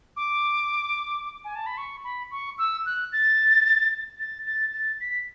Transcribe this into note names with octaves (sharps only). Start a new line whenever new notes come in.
D6
G#5
A5
B5
C#6
B5
C#6
E6
F#6
A6
A6
A6
A6
B6